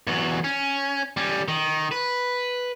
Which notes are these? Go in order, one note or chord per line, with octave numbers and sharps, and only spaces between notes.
E2 F#3
C#4
G3 C#4
D#3
B4